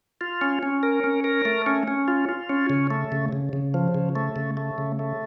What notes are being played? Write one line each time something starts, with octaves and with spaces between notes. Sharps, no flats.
F4
C#4
C#4
A#4
C#4
A#4
A3
C#4
C#4
F4
F4
C#4
C#3
A3
C#3
C#3
C#3
F3
C#3
A3
C#3
A3
C#3
A3